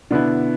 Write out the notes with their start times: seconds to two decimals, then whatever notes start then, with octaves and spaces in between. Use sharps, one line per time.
0.11 B2 D3 B3 D4 E4